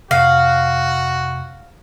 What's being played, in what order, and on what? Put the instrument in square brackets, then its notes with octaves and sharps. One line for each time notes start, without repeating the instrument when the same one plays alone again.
[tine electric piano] F2 C3 [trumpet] F#4 [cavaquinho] F5